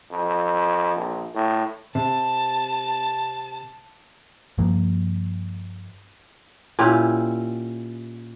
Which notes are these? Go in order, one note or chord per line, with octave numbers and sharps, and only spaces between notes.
F2
A#1
A2
C3 A5
G2 F3 A#3
A#2 C#4 E4 G4